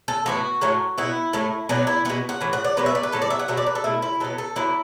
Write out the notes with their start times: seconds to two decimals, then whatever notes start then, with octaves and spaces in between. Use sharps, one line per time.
0.08 A4
0.26 A2 E3 B3 F#4
0.61 A2 F#3 A3
0.98 B2 B3 E4
1.33 A2 A3
1.69 B2 F#3 B3 D4
1.87 E4
2.05 B2 B3 E4
2.29 F#5
2.41 A2 E3
2.53 F#5
2.64 D5
2.77 B2 F#3 B3 B4
2.86 E5
2.95 D5
3.03 B4
3.12 A2 F#3 B3 A4
3.22 D5
3.30 E5
3.39 F#5
3.48 B2 F#3 A3 E5
3.57 D5
3.66 B4
3.75 A4
3.84 B2 A3 E4
4.02 E4
4.20 B2 F#3 B3 A4
4.38 A4
4.56 D3 F#3 B3 E4